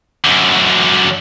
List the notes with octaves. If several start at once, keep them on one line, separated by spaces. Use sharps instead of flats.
F#2 D3